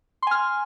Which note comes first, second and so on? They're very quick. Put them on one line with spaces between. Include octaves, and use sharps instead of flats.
C6 G#5 F6